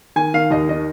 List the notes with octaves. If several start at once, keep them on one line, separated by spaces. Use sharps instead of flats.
D#3 G#5
D#3 F5
D#2 D#5
D#3 D#5